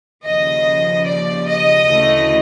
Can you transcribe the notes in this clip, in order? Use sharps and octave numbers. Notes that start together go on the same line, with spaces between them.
D#2 C#3 F3 D#5
D5
D#5
D2 C#3 E3 A3